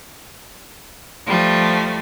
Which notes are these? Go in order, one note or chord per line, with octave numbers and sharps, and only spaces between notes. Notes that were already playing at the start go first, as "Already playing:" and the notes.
F3 G3 A3